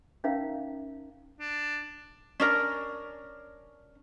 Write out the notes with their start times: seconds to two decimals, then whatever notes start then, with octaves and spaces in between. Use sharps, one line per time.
0.24 C#4 D#4 A#4 E5 F5 A#5
1.40 D4
2.40 C#4 D4 A#4